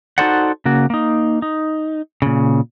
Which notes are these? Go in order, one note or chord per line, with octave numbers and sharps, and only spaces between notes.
D#4 F#4 A4 C5 D5 F#5
C#3 A#3 F#4
A#3 D#4
D#4
A#2 C#3